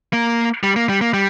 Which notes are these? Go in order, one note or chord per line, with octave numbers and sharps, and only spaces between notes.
A#3
G3
A#3
G3
A#3
G3